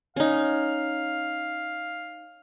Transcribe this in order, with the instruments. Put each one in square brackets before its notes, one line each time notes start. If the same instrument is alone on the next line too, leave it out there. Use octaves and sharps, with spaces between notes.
[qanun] C#4 D#4 [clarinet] F5